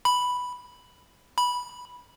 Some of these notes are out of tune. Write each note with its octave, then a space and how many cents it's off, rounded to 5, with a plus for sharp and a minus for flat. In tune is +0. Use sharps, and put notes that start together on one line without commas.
B5 +0
B5 -10